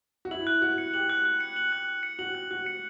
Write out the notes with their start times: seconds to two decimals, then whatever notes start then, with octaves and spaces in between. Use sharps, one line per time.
0.25 F#4
0.31 E4 F#7
0.47 F#6
0.62 F#4 F#6
0.78 C#7
0.94 G4 F#7
1.10 F#6
1.25 F#6
1.40 C#7
1.56 F#7
1.72 F#6
1.88 F#6
2.03 C#7
2.19 F#4 F#7
2.35 F#6
2.51 F#4 F#6
2.66 C#7